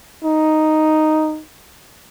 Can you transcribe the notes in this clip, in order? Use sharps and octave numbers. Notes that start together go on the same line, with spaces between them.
D#4